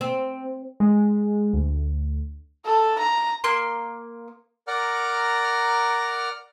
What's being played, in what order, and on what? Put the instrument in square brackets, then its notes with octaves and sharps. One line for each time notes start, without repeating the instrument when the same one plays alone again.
[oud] C4
[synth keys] G#3
D2
[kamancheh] A4
A#5
[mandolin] A#3 C6
[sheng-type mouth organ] A#4 D5 F#5 A#5 F6